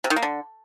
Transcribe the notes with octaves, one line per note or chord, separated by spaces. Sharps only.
C3
D#3
A#3
D3